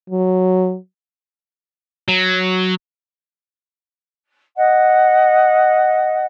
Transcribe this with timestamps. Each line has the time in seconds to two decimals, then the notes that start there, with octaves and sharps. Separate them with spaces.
0.10 F#3
2.08 F#3
4.56 D#5 F#5